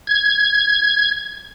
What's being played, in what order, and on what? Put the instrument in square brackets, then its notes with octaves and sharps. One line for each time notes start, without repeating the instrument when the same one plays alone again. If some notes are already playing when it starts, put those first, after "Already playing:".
[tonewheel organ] G#6